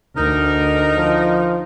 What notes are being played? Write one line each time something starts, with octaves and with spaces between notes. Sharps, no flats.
D2 D#4 A#4
F3